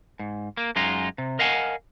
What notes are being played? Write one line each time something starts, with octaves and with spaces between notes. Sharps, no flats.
G#2
A#3
F#2 G#3 D#4 F4
C3
A#4 D#5 F5 F#5 G#5